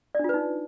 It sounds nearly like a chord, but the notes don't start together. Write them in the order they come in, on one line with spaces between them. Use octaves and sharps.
D5 D4 F4 B4 D#4